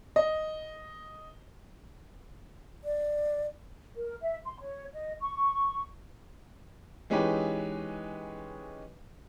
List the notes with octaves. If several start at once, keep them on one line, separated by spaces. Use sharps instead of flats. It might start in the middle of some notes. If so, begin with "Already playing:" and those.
D#5
D5
A#4
E5
C6
C#5
D#5
C#6
E3 G#3 C#4 D#4 G4 B4